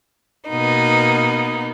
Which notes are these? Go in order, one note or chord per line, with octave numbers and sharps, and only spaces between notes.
B2 A#3 B3 D#4